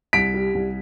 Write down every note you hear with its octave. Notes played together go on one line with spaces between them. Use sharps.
C2 B6 D7
G3
C2